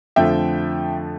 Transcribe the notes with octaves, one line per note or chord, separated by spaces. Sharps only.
F2 D3 F3 A3 E5 G5